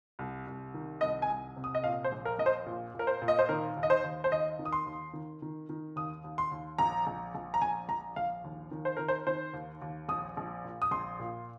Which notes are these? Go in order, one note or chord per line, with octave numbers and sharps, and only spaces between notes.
C2
C2
D#3
C2 D#5
G#5
C2
C3
D#6
D#5
A#2 F5
C5
A#1
A#4
A#1 D#5
C5
A#2
A#2 A#4
C5
A#2
D#5
C5
D#3 A#4
D#2
D#5
C5
D#2
C5
D#2 D#5
D#3
D#6
C6
D#2
D#3
D#3
D#3
D#2 D#6
D#2
C6
D#2
A#1 A#5
A#1
A#1
A#5
A#1 G#5
A#1 A#5
A#1 F5
D#2
D#3
C5
D#3 A#4
C5
D#3 C5
D#2
D#2
A#1 D#6
A#1
A#2
D#6
A#1 C6
A#2